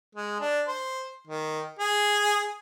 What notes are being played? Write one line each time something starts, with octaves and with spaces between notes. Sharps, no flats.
G#3
D4
C5
D#3
G#4